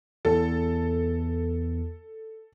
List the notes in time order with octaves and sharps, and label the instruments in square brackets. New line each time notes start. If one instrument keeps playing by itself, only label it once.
[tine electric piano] E2 [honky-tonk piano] A4